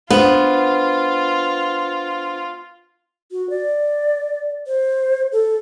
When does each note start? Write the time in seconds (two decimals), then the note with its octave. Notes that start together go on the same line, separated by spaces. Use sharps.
0.10 B3 D4 F4 C5
3.32 F#4
3.50 D5
4.67 C5
5.32 A4